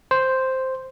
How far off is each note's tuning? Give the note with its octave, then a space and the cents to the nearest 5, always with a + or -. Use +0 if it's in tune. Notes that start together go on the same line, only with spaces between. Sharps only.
C5 +0